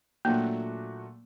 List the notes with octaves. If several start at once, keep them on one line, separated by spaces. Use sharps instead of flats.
A#2 F#3 A3 A#3 D4 F#4